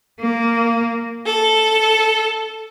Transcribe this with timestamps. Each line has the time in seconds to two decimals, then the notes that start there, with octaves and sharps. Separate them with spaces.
0.21 A#3
1.24 A4